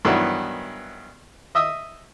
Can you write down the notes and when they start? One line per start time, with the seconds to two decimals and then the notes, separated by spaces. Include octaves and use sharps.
0.05 G2 D#3 E3 F#3 B3 E4
1.55 D#5 E5 D#6 E6